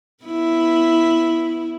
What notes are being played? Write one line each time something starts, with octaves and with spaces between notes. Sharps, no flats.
B3 E4